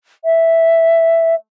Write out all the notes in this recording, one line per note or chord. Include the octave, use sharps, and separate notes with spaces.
E5